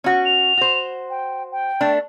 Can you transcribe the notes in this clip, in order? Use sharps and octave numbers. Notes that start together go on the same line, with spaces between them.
C#4 F#4
F7
F#4 C5
G5
G5
A3 D4